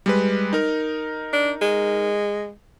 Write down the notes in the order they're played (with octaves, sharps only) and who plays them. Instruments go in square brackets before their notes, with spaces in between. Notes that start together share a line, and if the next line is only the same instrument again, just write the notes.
[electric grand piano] G3 G#3 B4
D#4 A#4
[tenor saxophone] D4
G#3